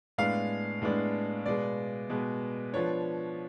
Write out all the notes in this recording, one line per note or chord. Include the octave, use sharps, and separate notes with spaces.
A2 G#3 B3 D4 F5
A2 G#3 B3 D4
B2 G#3 B3 D5
B2 G#3 B3
F3 B3 D4 C#5